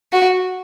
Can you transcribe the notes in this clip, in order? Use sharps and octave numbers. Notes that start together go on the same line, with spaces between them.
F#4